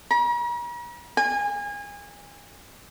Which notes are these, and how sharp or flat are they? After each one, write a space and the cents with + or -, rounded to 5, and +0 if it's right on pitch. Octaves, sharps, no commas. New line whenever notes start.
A#5 +45
G#5 -30